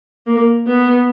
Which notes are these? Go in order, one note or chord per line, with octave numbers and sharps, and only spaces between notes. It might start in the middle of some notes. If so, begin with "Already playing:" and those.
A#3
B3